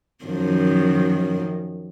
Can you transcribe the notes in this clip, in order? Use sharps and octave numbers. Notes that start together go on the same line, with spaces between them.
F#2 D#3 F3